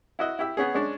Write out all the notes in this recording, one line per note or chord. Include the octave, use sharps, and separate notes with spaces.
E4 F#4 D#5
E4 G4 E5
B3 C#4 G#4
G#3 C#4 D4